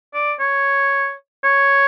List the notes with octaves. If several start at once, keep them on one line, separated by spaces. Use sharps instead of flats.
D5
C#5
C#5